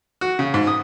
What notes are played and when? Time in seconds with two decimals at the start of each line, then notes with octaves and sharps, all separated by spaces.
0.21 F#4
0.39 C#3
0.54 G#2
0.67 D#6